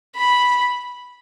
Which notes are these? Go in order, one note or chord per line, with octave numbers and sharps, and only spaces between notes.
B5